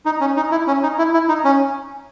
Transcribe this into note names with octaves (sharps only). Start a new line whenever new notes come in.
D#4
C#4
D#4
E4
C#4
D#4
E4
E4
D#4
C#4